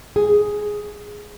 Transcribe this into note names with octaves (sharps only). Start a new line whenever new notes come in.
G#4